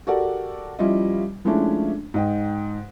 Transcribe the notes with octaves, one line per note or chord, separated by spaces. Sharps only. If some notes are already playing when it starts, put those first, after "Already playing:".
F#4 G4 A4 A#4 D5 F#5
F3 G3 C#4 E4 F4 D#5
F3 G#3 A3 C#4 D4 E4
G#2 D#5 G5